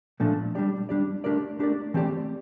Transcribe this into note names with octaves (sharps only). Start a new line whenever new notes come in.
A#2 F3 A3 D4
G3 D4 G4 D5
G3 D4 G4 D5
A3 D4 G4 A#4 D5
A3 D4 G4 A#4 D5
E3 A3 C4 G4 D5